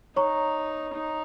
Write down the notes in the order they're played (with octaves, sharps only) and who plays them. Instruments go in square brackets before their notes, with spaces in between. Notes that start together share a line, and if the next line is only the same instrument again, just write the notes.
[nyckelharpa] D#4 [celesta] C#5 A#5 C#6
[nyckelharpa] D#4